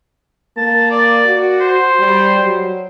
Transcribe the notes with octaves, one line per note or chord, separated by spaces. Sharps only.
A#3 A5
D5
F#4
C5
G3
F#3